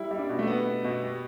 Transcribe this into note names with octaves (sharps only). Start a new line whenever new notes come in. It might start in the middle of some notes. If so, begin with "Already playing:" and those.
Already playing: G3 E4
G3 E4
D4
B2
A3
G3 B3
B2
B2
G3